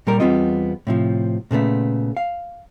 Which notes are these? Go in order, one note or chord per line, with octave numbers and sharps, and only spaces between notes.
A#2 G3 A#4
E2 G3 B3 C4 F4 D#5
A2 C3 F3
A#2 C#3 A3 B3
F5